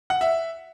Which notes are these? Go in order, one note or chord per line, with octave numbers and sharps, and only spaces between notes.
F#5
E5